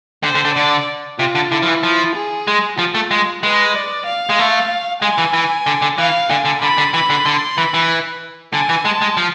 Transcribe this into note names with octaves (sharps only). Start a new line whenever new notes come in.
D3 C5
D3
D3
D3 D5
C3 F4
D3
D3 E4
F3
E3
F3
G#4
G#3
F3 F4
A3
G#3
G#3 B4
D5
F5
G#3
A3
G#3 G#5
E3
E3
D3
D3
E3 F5
D3 G#5
D3
D3 B5
D3
E3 B5
D3
D3 C6
E3 B5
E3
D3 G#5
E3
G#3 A5
G#3
F3